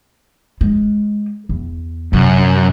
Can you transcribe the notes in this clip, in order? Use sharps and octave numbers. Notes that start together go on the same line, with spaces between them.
G#3
E2
F#2 C3